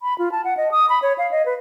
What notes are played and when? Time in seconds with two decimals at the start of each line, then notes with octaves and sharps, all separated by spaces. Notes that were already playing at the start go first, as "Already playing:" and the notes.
0.01 B5
0.19 F4
0.32 A5
0.44 F#5
0.57 D#5
0.72 D#6
0.89 B5
1.02 C#5
1.18 F5
1.31 D#5
1.46 B4